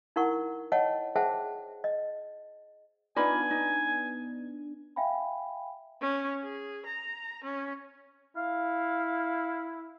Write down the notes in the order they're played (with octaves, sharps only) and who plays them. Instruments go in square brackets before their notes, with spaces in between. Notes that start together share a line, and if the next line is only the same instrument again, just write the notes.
[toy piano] D#4 E4 A#4 F#5 C#6
C#5 D#5 F#5 G5 A5
G#4 C5 E5 F#5 G5 A5
D#5
[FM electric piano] B3 D4 [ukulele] D#4 F4 B5 [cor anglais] G#5
[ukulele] D#4
[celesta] E5 F5 G5 G#5 B5
[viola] C#4
G#4
A#5
C#4
[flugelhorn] E4 [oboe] F5